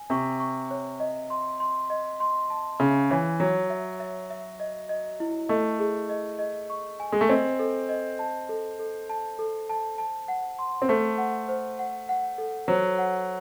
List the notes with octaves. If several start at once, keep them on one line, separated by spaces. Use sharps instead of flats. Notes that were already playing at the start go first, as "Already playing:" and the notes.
Already playing: G#5
C3 C#6
C#6
C#5
D#5
C6
C6
D#5
C6
A5
C#3 E5
E3 C#5
F#3 C#5
E5
E5
E5
D#5
D#5
E4
A3 D#5
G#4
D#5
D#5
C#6
G#5
G#3
A3
C4 D#5
A4
D#5
A5
A4
A4
A5
A4
A5
A5
F#5
C6
C4
A3 C5
F#5
C5
F#5
F#5
A4
F#3 C5
F#5